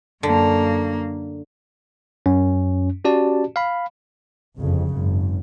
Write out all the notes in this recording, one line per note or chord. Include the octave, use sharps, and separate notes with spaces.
F#2 D3 A#3
F#2 C#4
C#4 F#4 G4 D5 A5
F5 B5
G1 F2 C#3
G#1 F#2